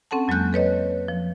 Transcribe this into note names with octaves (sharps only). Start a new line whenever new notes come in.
C4 C#4 A4 F#5 A5
F2 F#3 G#3 A#3 F#6 G6
A4 B4 C#5 D#5
F3